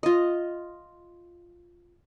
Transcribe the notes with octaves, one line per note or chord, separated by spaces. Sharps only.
F4 D#5